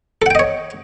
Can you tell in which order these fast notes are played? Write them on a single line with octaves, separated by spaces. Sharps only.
A4 F#5 G5 D#5 C#5